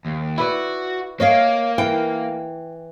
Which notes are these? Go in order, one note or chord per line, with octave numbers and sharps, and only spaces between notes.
D#2
E4 F#4 B4 D5
A#3 C#5 D#5 F5
E3 G5